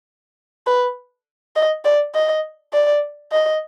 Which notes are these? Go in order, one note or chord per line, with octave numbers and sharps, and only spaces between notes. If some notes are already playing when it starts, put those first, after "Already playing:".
B4
D#5
D5
D#5
D5
D#5